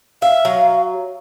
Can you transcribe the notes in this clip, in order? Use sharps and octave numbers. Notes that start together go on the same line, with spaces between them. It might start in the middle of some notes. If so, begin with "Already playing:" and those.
E5 F5
F#3